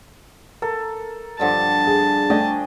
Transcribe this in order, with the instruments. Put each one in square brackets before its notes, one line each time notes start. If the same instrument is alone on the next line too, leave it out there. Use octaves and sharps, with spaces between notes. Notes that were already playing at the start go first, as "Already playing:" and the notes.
[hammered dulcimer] A4 [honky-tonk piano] A#4
[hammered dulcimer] G2 D3 F3 [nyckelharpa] A5
[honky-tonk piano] G#4
[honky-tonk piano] A3 D4 [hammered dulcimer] D#5 G5 G#5